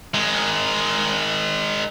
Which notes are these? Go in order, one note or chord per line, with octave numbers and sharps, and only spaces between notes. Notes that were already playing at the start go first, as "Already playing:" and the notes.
D#3 G#3